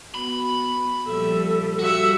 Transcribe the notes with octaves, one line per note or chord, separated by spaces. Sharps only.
B3 F#4 B5
A#2 F3 G3 A4 E5
G3 F#4 E5 F#5